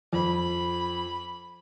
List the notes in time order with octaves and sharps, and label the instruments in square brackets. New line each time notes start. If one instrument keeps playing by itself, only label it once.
[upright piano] F2 [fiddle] B5